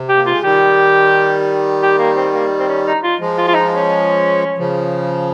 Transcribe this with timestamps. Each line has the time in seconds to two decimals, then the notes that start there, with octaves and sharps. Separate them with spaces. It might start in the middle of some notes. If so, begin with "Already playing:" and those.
Already playing: C3
0.09 G4
0.16 A#3
0.26 G#3 F4
0.43 D#3 G3 G4
1.82 G4
1.98 A#3
2.16 C4
2.34 A#3
2.59 C4
2.69 C#4
2.86 D#4
3.03 F4
3.19 F3 G#3
3.38 F4
3.48 F4
3.54 D#4
3.72 C#4
4.58 C#3 F3